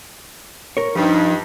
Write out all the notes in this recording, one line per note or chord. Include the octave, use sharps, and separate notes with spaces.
A#4 C#5
G2 F3 D#4